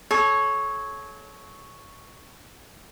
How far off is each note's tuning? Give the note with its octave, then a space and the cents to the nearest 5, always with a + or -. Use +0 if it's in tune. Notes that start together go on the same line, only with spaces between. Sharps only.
A4 -35 C#5 +0